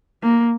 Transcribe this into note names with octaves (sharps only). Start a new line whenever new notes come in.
A#3